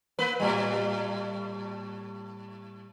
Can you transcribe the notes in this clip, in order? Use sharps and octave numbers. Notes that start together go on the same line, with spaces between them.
A#3 B4
A2 G3